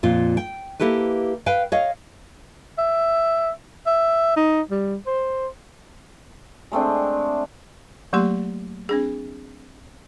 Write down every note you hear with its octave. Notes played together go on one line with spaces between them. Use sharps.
F2 A#2 F4
G5
A#3 E4 G4 A4 B4
B4 F5 G5
C#5 D#5 F5
E5
E5
D#4
G3
C5
G#3 A3 C4 D4
F#3 A3 A#3 G4 C6
C4 D4 G#4